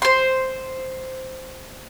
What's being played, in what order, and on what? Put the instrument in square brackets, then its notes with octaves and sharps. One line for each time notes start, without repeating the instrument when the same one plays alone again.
[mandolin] C5 C6